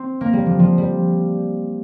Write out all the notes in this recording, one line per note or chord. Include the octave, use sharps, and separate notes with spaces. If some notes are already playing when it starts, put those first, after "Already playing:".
Already playing: C4
A#3
G3
F3
F3
G3